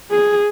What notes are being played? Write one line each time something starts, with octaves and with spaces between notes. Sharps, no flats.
G#4